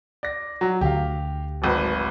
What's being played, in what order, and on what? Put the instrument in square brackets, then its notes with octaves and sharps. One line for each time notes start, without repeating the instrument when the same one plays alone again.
[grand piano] D5 A#6
F#3
[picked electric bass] D2 D3 [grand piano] G4 F5
[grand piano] D1 G#1 B4